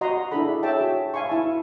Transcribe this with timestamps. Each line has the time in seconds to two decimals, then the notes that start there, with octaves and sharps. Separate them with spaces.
0.01 F#4 D#5 F#5 A#5 C6
0.31 D4 E4 F4 G#4 A4 B5
0.63 G#4 C#5 E5 G5 A5
0.81 F#4
1.14 E5 F5 G#5 C6 C#6
1.29 E4 A5